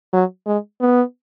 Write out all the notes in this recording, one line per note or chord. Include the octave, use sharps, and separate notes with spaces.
F#3
G#3
B3